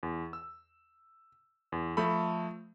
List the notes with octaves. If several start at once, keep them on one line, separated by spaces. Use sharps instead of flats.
E2
E6
E2
F3 A3 A4 B5